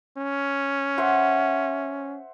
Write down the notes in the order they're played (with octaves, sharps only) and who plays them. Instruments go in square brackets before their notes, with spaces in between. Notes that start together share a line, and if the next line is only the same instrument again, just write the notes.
[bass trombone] C#4
[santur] C5 E5 F#5